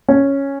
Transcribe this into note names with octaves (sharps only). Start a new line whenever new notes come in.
C#4